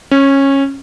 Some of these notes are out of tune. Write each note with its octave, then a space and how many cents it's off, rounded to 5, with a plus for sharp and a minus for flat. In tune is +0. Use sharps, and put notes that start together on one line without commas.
C#4 -15